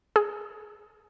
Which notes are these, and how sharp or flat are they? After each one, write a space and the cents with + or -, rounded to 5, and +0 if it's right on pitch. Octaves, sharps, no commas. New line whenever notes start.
G#4 +15